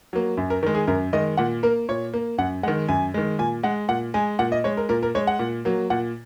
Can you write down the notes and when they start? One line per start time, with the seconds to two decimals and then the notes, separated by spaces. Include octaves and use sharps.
0.13 F#3 A#3
0.37 F#2
0.50 A#4
0.63 D#3 A#4
0.66 G#3
0.75 G#4
0.87 F#2 A#4
1.13 D#3 G#3 D#5
1.37 A#2 F#5
1.63 A#3 A#4
1.89 A#2 C#5
2.14 A#3
2.38 F#2 F#5
2.63 G#3 F#5
2.68 D#3
2.88 F#2 G#5
3.14 D#3 G#3
3.39 A#2 G#5
3.63 G#3 F#5
3.89 A#2 F#5
4.14 G#3 G#5
4.39 A#2 F#5
4.52 D#5
4.64 G#3 C#5
4.77 A#4
4.89 A#2 A#4
5.03 A#4
5.15 G#3 C#5
5.27 F#5
5.39 A#2
5.65 F#3 A#3
5.90 A#2 F#5